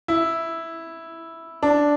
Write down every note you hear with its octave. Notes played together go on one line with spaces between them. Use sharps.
E4
D4